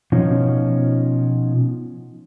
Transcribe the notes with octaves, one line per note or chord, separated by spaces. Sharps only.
B2 F3 C#4 D#4